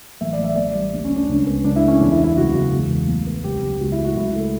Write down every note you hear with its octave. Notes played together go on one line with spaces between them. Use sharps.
A1 E5
D5
A1
E5
A1 D5
G3
D2
C#4
D2
D4
C#2 C#4
B3
C#2 D4
E4
A3
C#4
E2 D4
E4
B3
E4
C#2 F#4
C#2
E2
E2
A1
B3
C#2 G4
C#2
C#2 F#4
E4
A3
F#4
C#2 E4
A3